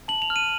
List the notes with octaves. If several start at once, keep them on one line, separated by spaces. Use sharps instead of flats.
A5 F#7
F7
F6
D#7